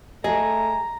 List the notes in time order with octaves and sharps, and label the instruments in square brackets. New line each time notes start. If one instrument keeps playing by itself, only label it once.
[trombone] A3 [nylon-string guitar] G#4 D#5 [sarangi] A#5